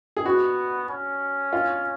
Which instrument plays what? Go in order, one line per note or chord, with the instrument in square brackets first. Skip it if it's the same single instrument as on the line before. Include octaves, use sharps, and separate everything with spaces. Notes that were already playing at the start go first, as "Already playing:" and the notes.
[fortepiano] G#4
[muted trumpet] B3 [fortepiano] F#4
[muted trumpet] C#4
[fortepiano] F4